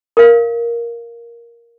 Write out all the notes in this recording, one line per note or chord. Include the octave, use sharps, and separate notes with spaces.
A#4 F5